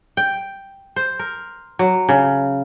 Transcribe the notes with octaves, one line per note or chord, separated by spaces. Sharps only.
G5
C5
A#4
F#3
C#3